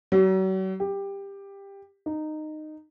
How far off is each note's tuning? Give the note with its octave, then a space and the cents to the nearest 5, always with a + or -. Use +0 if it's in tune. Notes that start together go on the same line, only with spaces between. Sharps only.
F#3 +40
G4 +15
D#4 -15